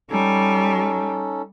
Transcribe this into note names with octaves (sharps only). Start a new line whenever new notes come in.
G3 C#4 D#4 A4